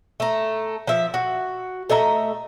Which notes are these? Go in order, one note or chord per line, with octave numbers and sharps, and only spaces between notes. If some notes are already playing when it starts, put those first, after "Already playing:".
A3 A#5
F3 E5
F#4
A3 D#5 E5 A#5